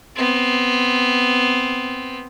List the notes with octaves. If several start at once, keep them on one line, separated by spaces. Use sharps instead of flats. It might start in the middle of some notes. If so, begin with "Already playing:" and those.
B3 C4